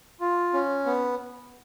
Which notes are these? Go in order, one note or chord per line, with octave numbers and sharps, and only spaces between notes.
F4
C#4
B3